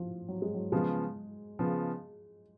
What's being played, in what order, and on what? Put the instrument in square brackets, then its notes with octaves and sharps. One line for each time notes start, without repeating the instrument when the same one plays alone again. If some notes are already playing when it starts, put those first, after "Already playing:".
Already playing: [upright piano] F3
F#3
G#3
F#3
[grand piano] C#3 F3 B3 [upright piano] G#3
[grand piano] C#3 F3 B3